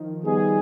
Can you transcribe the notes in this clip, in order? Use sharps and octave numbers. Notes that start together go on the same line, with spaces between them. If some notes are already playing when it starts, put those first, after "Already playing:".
Already playing: D#3 F3
G3 B3 D#4 G#4